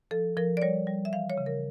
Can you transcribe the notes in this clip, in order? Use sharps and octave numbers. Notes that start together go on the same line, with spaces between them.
F3 A4
F3 A#4
D5
G3 C#5
G3
E5
E3 F5
C#5
C#3
A#4